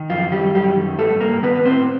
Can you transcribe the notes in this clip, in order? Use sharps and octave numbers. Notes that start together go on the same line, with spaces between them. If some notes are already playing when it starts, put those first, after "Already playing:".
Already playing: D#3
F#2 F3 F4
D#3 G3 G4
F#2 G3 G4
D#3
G2 A3 A4
G2 A#3 A#4
D#3 B3 B4
B4
A2 C4 C5